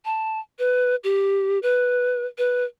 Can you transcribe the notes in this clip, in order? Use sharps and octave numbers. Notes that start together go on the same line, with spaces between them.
A5
B4
G4
B4
B4